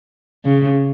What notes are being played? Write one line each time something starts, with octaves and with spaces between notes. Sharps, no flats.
C#3